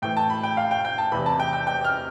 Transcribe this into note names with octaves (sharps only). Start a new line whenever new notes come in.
A2 E3 G5
A5
B5
G5
F5
G5
G5
A5
E2 C3 E3 B5
A5
G5
G5
G5
F6